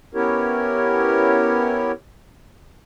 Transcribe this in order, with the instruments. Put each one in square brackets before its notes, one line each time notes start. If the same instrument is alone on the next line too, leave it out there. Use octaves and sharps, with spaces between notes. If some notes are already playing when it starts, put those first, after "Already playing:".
[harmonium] B3 C#4 E4 G4 A#4 C#5